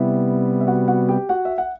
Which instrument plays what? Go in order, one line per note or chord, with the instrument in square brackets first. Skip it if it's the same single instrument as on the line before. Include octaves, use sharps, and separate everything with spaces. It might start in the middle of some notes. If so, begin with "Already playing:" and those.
Already playing: [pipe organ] C3 G3 B3 [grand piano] E4 E5
[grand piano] E5
F#4 F#5
F#4 F#5
G4 G5
F#4 F#5
E5
F#5